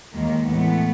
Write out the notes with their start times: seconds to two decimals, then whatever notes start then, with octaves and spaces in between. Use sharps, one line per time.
0.13 D#2 D#3 G#3 A#3
0.48 A2 E3 G#3 A3 B3